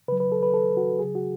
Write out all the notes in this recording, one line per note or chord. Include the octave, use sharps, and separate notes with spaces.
C#3 F#3 B4
B4
A4
B4
A4
F#4
C#3 F#3 G#4
F#4